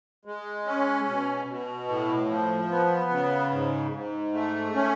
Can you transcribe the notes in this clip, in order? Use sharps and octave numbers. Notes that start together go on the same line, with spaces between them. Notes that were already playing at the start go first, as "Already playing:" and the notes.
G#3
C#4
B2
B2
A2
F3
B3
C#3
G#2
G#2
A3
C#4